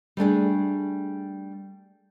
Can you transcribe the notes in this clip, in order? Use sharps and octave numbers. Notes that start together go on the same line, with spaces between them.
G3 A3 D4 G#4